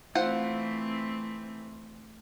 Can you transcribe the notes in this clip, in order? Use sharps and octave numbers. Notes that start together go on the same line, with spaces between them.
E3 A3 C4 F4 C5 F#5